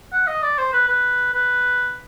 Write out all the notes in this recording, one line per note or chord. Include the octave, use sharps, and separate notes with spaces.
F#5
D#5
D5
C5
B4
B4
B4